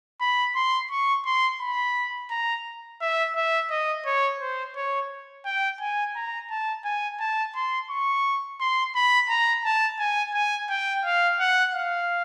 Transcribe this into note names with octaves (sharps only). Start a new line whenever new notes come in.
B5
C6
C#6
C6
B5
A#5
E5
E5
D#5
C#5
C5
C#5
G5
G#5
A#5
A5
G#5
A5
C6
C#6
C6
B5
A#5
A5
G#5
G#5
G5
F5
F#5
F5